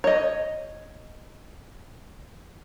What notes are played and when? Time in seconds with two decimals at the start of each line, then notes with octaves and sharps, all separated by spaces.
0.04 C#5 D#5